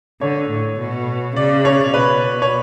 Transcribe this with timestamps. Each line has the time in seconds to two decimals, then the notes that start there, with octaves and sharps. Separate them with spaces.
0.21 D3 C#5
0.50 A2
0.80 B2
1.36 C#3 D5
1.65 C#5
1.93 B2 B4
2.42 C#5